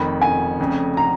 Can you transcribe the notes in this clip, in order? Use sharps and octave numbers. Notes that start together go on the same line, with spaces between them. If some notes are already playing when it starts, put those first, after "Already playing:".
Already playing: F1 F2 D#3 B5
G#5
F1 F2 C#3
A#5